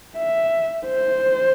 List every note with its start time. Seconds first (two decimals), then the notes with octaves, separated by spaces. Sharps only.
0.16 E5
0.86 C5